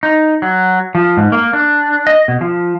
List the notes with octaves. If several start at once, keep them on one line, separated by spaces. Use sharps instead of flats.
D#4
F#3
F3
G#2
A#3
D4
D#5
B2
F3